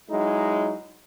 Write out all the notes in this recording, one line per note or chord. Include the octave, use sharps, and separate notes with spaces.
F#3 G#3 D#4 E4